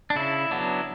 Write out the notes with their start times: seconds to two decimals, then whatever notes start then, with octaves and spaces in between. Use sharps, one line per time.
0.10 D4
0.16 C#3 E4
0.51 F#3 B3 D4